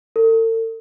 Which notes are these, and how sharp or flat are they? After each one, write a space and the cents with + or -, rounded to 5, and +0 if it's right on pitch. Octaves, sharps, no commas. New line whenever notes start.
A4 +45